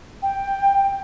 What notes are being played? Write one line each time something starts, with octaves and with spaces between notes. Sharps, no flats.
G5